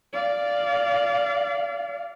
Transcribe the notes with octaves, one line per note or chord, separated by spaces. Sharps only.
D5 F5